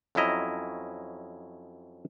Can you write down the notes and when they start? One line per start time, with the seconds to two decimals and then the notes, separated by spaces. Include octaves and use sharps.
0.15 F2 F#3 C#4 E4 D#5 A#5